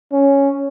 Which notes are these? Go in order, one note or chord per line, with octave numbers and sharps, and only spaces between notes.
C#4